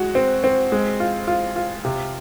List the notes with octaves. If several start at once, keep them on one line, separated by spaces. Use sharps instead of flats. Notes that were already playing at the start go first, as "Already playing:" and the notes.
Already playing: G#3 F#4
C4
C4
G#3
F4
F4
F4
C3